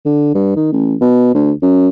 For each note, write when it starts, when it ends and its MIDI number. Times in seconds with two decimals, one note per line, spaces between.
0.05 0.32 50
0.34 0.53 43
0.56 0.71 51
0.72 0.94 33
1.01 1.31 47
1.35 1.52 38
1.62 1.88 42